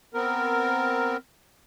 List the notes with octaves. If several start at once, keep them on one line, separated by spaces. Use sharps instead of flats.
B3 C4 A#4